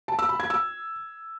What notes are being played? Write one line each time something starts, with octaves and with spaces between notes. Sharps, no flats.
A5
E6
B5
G#6
E6